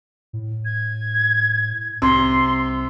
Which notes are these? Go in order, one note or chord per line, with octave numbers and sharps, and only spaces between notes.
A2
G#6
C2 C3 C6